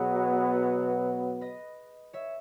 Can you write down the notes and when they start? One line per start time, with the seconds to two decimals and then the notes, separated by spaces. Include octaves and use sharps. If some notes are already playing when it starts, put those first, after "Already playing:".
Already playing: B2 F#3 B3 G#4 B4
1.41 B4 D#5
2.13 C#5 E5